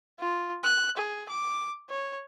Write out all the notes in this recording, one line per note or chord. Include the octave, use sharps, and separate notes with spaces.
F4
F#6
G#4
D6
C#5